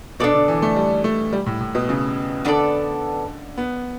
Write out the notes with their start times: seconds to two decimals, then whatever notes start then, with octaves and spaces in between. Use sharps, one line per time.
0.20 B2 D4 A4 D5
0.34 D3
0.48 E3
0.62 A3
0.76 G3
1.04 A3
1.33 G3
1.46 A2
1.60 A2
1.75 B2
1.89 C#3
2.45 D3 B3 D4 A4 D5
3.58 B3